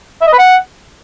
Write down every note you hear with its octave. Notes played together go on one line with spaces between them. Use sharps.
E5
D#5
B4
F#5